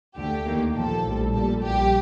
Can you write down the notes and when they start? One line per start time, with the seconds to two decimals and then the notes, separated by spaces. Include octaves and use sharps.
0.16 D2 D3 A3 G4
0.46 D#2 D#3 A#3
0.75 A#1 A#2 F3 A4
1.04 A#1 A2 G3
1.33 A#1 A#2 G3 A4
1.63 A#1 A#2 G3 G4